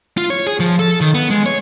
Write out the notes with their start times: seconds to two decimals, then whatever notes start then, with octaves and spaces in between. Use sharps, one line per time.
0.17 F4
0.30 C#5
0.47 G#4
0.60 F3
0.79 A4
1.01 D#3
1.14 B3
1.30 G#3
1.46 C#5